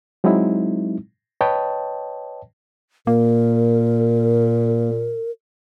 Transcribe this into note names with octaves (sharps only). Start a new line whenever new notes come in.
F#3 G#3 C4 D#4 E4
B4 C#5 D#5 G5 A5
A#2 A#3 A#4